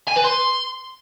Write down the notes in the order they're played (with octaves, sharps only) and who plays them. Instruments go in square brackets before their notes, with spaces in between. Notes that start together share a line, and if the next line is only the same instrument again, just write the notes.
[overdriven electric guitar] G#5
B4
C6